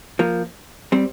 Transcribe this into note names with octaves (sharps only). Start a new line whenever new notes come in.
F3 A#3
G3 C4